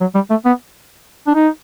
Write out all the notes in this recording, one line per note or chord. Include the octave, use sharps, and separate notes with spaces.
F#3
G3
A3
B3
D4
D#4